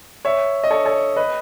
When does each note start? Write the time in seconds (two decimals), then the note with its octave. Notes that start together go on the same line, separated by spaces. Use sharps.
0.25 C#5 E5
0.64 D#5
0.71 A4 C#5
0.85 A4 C#5
1.16 B4 D#5